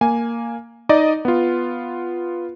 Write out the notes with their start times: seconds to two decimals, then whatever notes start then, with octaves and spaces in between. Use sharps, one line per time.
0.01 A#3 G#5
0.89 D#4 D5 D#5
1.25 B3 F4